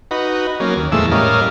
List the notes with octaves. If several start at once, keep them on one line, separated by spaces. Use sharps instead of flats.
D#4 F#4 B4
F#3 A#3 C#4
D#2
F2 A#2 E3 G#3 A3 E6
A2 G3 C#4 A#4 D#5 F5